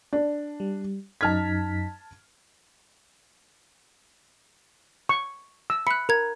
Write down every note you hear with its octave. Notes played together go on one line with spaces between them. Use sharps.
D4
G3
F#2 D#4 A5 F6 G#6 B6
C#6
E6
B5 F#6 C#7
A#4 A#5 G#6